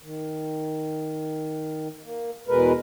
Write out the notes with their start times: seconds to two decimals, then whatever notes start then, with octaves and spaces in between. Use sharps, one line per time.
0.03 D#3
2.03 A#3
2.48 E2 B2 G#3 A#4 B4